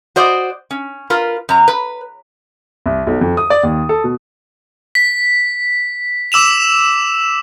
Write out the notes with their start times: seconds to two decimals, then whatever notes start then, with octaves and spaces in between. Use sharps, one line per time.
0.16 F#4 C5 D5 D#5
0.71 C#4
1.10 F4 A#4 B4
1.49 F#2 A#5
1.68 B4
2.86 C2
3.07 B1
3.21 F2
3.37 D#6
3.50 D5
3.63 D#2
3.89 A4
4.04 B2
4.95 B6
6.32 D6 E6 E7 F7